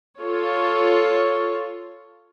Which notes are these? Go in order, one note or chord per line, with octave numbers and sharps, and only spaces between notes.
F4 A4 C#5